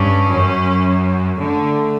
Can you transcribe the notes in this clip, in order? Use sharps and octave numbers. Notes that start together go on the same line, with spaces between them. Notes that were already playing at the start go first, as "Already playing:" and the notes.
Already playing: G2 C#4
F#2
D3 A3